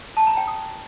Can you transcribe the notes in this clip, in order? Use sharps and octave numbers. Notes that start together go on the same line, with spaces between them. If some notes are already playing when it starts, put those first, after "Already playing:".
A5
A#5
G5
D#6